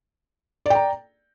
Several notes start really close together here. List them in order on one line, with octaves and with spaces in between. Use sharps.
D5 G5 A#5